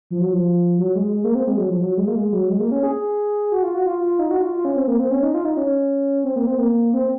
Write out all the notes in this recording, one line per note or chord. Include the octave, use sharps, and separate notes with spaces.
F3
F#3
F3
F#3
G#3
G#3
A#3
C4
G#3
F#3
F3
F#3
G#3
A#3
G#3
F#3
G#3
A#3
C#4
G#4
F#4
F4
F#4
F4
F4
D#4
F#4
F4
F4
C#4
C4
A#3
C4
C#4
D#4
F4
D#4
C#4
C4
A#3
C4
A#3
C4